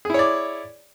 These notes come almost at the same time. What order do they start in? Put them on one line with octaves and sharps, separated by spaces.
G#4 E4 C#5 D5